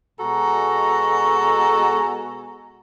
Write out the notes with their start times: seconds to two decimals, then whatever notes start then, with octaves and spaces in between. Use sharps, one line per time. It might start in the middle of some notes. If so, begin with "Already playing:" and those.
0.20 B2 G#3 F#4 A4 G#5 A#5